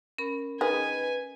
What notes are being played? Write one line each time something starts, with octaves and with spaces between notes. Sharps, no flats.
C#4 A#4 B5
D#3 G#4 B4 G#5